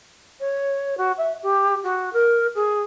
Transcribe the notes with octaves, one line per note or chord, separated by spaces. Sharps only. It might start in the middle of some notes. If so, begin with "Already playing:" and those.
C#5
F#4
E5
G4
F#4
A#4
G#4